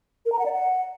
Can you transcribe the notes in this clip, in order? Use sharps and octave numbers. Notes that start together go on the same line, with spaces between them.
A#4
A#5
F#5
D5
F#5